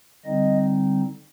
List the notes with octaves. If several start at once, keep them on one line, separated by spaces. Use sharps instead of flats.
D3 G3 C4 D#4 D#5